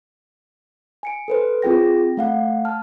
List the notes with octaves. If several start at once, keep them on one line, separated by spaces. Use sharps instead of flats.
G#5 C#7 D7
A4 B4 C5
C4 F4 G#4 G5 A#6
A3 F5 F#5
A5 F6